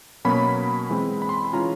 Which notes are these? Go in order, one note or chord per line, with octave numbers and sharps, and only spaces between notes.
B2 F#3 A#3 C#4 B5
E3 G#3 C4 E4
B5
C6
B5
E3 G#3 C#4 F4 A#5